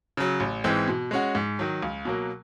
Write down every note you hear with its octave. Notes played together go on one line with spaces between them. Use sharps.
C#3 F#3
A1
G#2 E3 G#3 C4
B2
G#3 C#4 F#4
G#2
D#3 F#3
C#2
B2 F#3 A#3